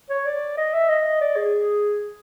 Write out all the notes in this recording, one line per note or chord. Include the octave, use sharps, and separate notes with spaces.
C#5
D5
D#5
E5
D#5
D5
G#4